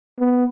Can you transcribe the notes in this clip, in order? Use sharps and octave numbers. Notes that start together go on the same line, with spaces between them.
B3